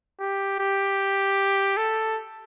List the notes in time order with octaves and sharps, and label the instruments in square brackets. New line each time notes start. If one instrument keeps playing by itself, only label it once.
[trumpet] G4
G4
A4